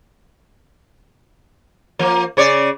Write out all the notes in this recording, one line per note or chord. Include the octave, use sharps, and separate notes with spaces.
F3 A#3
C#3 C#5 D5